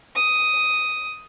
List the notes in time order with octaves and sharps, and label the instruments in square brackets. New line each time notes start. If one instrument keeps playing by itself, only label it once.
[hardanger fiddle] D#6